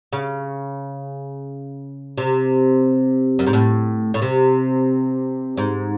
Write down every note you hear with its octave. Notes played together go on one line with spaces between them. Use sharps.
C#3
C3
F#2
G#2
A2
A2
C3
G#2